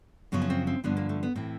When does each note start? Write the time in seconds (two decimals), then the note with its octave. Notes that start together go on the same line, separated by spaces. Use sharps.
0.32 F#2 C#3 F3 B3
0.42 C#4
0.50 C4
0.67 C4
0.84 G2 D3 F3 B3
0.97 A#3
1.09 A3
1.23 B3
1.35 A2 E3 C4